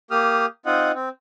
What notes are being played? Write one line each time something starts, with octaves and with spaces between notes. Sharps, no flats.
A#3 G4 D#6 F6
C4 D#4 F4 D#5 F#5
C4